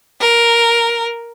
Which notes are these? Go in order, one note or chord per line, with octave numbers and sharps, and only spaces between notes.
A#4